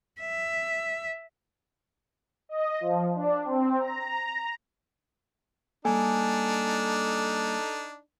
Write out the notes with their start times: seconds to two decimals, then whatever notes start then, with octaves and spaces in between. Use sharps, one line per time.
0.21 E5
2.49 D#5
2.81 F3
3.15 D4
3.45 C4
3.79 A#5
5.85 G3 A#3 D4 D#4 A4 G#5